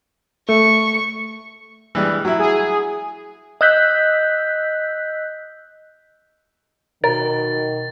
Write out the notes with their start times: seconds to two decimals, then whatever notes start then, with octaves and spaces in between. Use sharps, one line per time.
0.49 A3 C#6
1.95 E3 G3 G#3
2.25 F#3 E4
2.39 G#4
3.61 D#5 E6 F#6 G6 B6
7.04 B2 D#3 A#4 A6